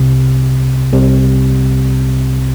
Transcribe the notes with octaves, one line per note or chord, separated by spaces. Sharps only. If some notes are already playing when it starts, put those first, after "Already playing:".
Already playing: C2 C3
C2 C3